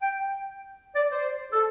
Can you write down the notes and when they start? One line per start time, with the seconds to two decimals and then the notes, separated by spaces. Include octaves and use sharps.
0.02 G5
0.96 D5
1.12 C5
1.52 A4